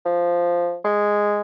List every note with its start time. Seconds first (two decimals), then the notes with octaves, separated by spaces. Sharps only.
0.05 F3
0.84 G#3